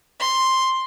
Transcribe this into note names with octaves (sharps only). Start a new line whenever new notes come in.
C6